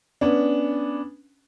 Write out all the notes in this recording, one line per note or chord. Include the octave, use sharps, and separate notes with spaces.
B3 C#4 D4